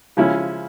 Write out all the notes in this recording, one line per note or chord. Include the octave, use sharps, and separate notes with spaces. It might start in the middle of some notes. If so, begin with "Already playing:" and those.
C#3 F3 G#3 C#4 E4